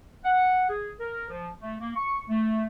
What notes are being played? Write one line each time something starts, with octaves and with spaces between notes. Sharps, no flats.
F#5
G#4
A#4
F3
A3
A#3
C#6
A3